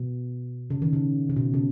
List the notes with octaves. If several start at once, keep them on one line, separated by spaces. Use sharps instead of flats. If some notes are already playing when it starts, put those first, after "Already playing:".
Already playing: B2
C#3
D#3
C#3
C#3
B2
C#3